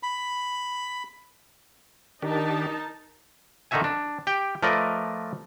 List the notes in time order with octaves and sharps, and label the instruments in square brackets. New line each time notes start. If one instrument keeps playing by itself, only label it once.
[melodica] B5
[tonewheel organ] D#3 D4 G4 [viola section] D#4 A#4 A5
[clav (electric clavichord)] D3 D#3 D#4 F#4 E5 G#5
D4
G4 G5
F3 A3 A#4 B4 D5 D#5